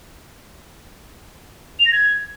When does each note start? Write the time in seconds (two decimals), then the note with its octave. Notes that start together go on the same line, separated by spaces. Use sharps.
1.79 F7
1.86 A#6
1.92 G#6